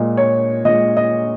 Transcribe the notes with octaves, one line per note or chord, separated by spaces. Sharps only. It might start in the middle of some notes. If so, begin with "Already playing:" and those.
Already playing: A#2 G#3 D#5
C#5
A#2 G#3 D#5
D#5